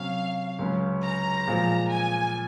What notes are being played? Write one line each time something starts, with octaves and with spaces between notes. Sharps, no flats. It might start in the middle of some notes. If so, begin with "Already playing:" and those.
Already playing: C3 F#3 C#4 F5
C#2 C#3 F#3 C#4
A#5
A#2 F3 G#3
G#5